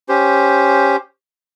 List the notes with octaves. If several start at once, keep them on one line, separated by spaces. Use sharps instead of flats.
C#4 G4 C5